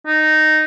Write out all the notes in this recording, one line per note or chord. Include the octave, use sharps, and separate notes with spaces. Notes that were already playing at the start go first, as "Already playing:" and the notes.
D#4